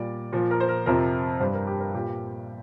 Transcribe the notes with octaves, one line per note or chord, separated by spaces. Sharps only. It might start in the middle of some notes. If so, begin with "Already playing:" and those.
Already playing: A#2 G3 D5
A#2 F3
A#4
C5
A#4
F2 C3 F3 A#4
G2 G3 C5
A#4
G4
A#4
A#2 G3 G4